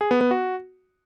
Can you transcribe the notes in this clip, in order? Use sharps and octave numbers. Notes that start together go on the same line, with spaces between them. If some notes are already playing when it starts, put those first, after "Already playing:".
G#4
B3
B3
F#4